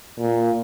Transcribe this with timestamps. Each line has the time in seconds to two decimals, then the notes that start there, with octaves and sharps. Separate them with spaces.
0.19 A#2